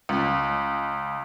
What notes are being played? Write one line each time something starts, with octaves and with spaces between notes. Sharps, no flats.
C#2